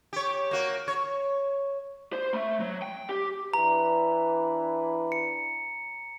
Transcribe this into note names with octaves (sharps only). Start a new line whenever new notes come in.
G4 C#5
A#3 F#4
C#5
C5
A3
F#3
G5
G4
E3 D4 B4 A#5
C#7